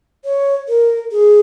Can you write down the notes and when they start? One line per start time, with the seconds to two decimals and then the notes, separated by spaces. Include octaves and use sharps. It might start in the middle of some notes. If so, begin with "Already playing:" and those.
0.24 C#5
0.68 A#4
1.12 G#4